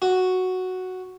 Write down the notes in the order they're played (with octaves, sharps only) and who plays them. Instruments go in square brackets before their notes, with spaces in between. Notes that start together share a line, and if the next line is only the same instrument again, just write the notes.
[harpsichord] F#4